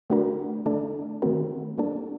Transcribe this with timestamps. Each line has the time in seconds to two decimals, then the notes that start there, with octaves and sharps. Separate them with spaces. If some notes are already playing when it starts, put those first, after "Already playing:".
0.10 D3 A3 D4 F#4 A#4
0.66 D3 A3 D4 A4
1.22 D#3 A3 C4 F#4 A#4
1.78 G3 A#3 D4 A4